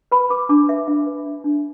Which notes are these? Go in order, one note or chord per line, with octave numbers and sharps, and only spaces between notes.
B4 B5
B4 D6
D4 D6
B4 E5
D4 E5
B4
D4
D4